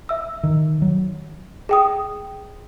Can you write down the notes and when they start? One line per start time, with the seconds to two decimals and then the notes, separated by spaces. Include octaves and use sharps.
0.09 E5 E6
0.44 D#3
0.82 F#3
1.69 G#4 G5 D#6